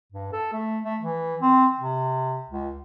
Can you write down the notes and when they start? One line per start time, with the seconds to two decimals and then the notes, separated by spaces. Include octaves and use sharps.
0.12 G2
0.33 A4
0.53 A3
0.85 A3
1.01 E3
1.41 C4
1.80 C3
2.49 C#2